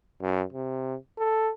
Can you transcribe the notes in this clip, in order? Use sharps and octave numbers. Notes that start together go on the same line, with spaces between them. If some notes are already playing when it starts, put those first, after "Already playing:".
F#2
C3
A4